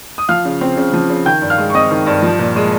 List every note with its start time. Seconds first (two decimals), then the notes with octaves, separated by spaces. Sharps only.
0.18 D#6
0.29 F3 F5 F6
0.45 C#3
0.61 C4
0.77 C#3
0.93 F3
1.09 C#3
1.26 D#3 G5 G6
1.42 G2
1.50 F5 F6
1.58 G#3
1.70 C#6
1.74 C4 D#5 D#6
1.91 D#3
2.07 G2
2.23 F3
2.39 A#2
2.56 G#3